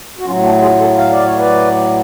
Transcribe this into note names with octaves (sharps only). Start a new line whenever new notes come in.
F#4
A2 F#3 C#4 F4
D4 F#4
F4 G#4
F#4 A4
F5
D5
C#5
B4 D5